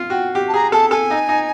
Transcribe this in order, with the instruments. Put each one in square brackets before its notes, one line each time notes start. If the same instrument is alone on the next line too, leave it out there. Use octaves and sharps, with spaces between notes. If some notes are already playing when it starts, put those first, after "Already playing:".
Already playing: [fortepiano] F4
[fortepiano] F#4 [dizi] G5
[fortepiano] G4
[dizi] A5
[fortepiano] G#4 [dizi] A#5
[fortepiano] A4 [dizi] A5
[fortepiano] A4 [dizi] G#5
[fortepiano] D#4
D#4